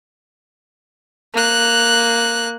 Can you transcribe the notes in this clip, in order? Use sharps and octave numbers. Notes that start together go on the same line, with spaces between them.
A#3 F#6